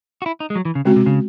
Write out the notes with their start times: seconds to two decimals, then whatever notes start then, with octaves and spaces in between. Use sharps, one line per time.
0.22 F#4
0.26 E4
0.40 D#4
0.50 G#3
0.55 F#3
0.65 E3
0.75 C#3
0.85 C#3 G#3 C4 F#4
0.96 C3
1.06 C#3